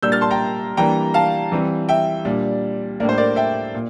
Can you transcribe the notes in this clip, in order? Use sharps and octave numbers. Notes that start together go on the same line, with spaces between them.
A#2 G3 A#3 D4 E6 G6
F6 A6
A5 C6
G5 A#5
E3 G3 A#3 D4 G5 A#5
F5 A5
E3 G3 C4
E5 G5
A#2 G3 D4
A2 G3 A#3 D4 A#4
C5
A#4 D5
E5 G5
A#2